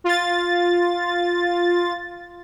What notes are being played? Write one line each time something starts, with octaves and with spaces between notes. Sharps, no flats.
F4 A6